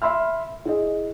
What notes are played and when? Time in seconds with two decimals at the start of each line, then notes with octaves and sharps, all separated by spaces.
0.02 E5 B5 C6 E6 F6
0.65 E4 G#4 D#5